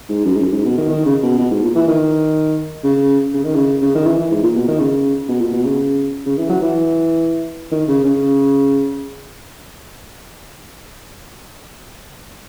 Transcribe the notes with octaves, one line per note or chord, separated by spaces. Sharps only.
G#2
F#2
G#2
F#2
G#2
B2
D#3
D#3
C#3
B2
B2
G#2
A#2
E3
D#3
C#3
C#3
D#3
C#3
C#3
D#3
E3
E3
G#2
A#2
B2
D#3
C#3
B2
A#2
B2
C#3
C#3
E3
F#3
E3
D#3
C#3
C#3